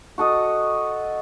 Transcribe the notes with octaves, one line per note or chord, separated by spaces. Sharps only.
F#4 A4 D#5